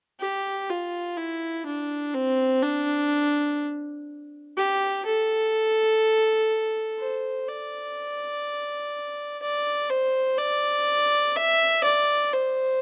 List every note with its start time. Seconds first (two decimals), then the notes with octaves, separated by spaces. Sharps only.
0.20 G4
0.70 F4
1.17 E4
1.66 D4
2.14 C4
2.63 D4
4.57 G4
5.06 A4
6.99 C5
7.48 D5
9.42 D5
9.90 C5
10.38 D5
11.36 E5
11.84 D5
12.33 C5